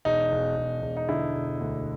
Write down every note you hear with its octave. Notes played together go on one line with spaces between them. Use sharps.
E1 D#4
E1
E1
E1
D#4
D3 E4
E1
D2